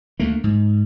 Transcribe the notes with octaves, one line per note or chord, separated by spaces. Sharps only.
D2 A3 A#3
G#2